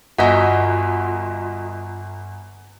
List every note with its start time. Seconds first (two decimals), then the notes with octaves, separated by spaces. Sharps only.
0.18 G1 F4 F#4 D#5 E5 F#5 G#5